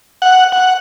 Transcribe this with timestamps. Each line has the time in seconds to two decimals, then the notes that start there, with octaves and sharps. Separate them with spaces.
0.22 F#5
0.52 F#5